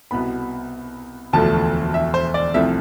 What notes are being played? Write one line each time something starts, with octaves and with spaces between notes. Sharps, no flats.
C2 B2 B3 B5
E1 D2 D3 F3 A3 A5
E5
C5
D5
C2 C3 F3 A3 E5